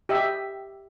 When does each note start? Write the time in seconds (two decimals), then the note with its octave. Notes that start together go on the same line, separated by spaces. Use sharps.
0.09 G4 D#5 E5